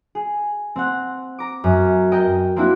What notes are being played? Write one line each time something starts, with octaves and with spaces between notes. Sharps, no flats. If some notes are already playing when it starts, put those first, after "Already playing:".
G#4
C4 F#5
A#5 D6
F#2
A#4 D#5 G5
A#3 C4 D4 E4 F#4